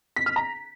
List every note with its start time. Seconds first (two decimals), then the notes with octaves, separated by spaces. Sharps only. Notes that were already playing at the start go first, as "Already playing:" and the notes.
0.16 B6
0.26 F6
0.36 A#5